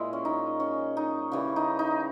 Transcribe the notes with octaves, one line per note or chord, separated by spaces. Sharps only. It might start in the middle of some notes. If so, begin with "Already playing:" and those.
Already playing: A#2 G#3 E4
C#4
D#4
C#4
D#4
C#3 E3 G3
D#4
D#4